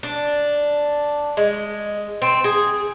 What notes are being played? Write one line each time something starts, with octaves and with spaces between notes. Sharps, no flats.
D4
G#3
C4
G#4